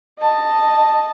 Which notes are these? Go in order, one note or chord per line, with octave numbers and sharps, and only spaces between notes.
D#5 A5